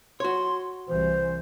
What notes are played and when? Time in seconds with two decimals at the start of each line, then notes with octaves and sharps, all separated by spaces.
0.20 F#4 C#5 C6
0.88 C2 E3 C5